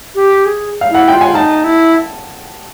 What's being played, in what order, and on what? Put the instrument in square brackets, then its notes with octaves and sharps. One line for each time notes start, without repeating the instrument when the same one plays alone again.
[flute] G4
G#4
[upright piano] F5
[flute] E4 [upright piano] F#5
[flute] F4 [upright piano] G5
[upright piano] G#5
[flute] D#4 [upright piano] A5
[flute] E4